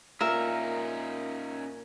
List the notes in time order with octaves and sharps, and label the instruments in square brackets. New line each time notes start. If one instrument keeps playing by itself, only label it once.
[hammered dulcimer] A#2 [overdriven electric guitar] C#4 D#4 [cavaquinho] A#4 E5